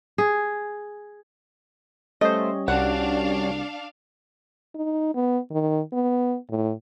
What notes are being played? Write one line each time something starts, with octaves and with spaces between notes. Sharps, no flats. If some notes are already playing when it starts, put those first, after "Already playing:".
G#4
G3 A3 C#4 C5 D#5
C2 D4 F#4 F5 F#5
D#4
B3
D#3
B3
A2